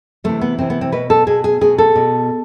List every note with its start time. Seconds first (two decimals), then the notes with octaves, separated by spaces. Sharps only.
0.24 C3 E3 A3
0.42 B3
0.58 C3 E3 C4
0.70 B3
0.81 C4
0.92 B2 B4
1.10 A4
1.27 B2 G#4
1.44 G#4
1.61 B2 G#4
1.78 A4
1.95 B2